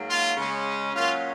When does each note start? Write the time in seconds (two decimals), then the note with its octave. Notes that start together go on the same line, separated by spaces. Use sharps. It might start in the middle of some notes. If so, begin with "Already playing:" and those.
Already playing: G#2 F#3 A#3
0.09 F4
0.37 C#3 G#3 C#4
0.93 A#2 F#3 A#3 C#4 F4